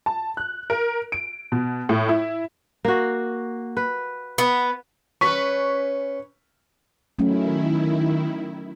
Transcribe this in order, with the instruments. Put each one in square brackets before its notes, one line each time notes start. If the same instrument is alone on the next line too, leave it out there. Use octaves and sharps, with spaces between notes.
[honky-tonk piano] A5
F#6
A#4
D7
B2
A2
E4
[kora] A#3 F#4
B4
[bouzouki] B3
[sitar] C#4 B4 [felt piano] C#6 B6
[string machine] D#3 E4 [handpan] F#3 A3 C#4